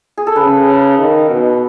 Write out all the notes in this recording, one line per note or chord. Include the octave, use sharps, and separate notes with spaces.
G#4
A4
C#3 B4
D#3
B2